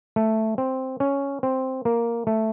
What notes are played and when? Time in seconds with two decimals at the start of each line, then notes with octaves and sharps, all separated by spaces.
0.16 A3
0.58 C4
1.00 C#4
1.43 C4
1.85 A#3
2.27 A3